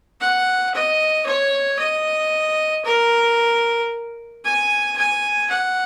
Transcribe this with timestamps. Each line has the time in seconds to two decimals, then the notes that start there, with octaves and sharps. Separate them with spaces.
0.21 F#5
0.74 D#5
1.26 C#5
1.79 D#5
2.85 A#4
4.45 G#5
4.97 G#5
5.50 F#5